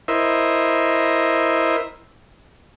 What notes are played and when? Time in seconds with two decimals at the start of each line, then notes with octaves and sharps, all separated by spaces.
0.08 E4 A#4 C5 D#5 E5